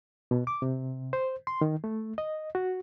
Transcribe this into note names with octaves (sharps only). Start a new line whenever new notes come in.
B2
D6
C3
C5
C6
D#3
A3
D#5
F#4